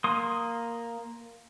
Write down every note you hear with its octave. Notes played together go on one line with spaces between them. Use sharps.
A#3 C6 D#6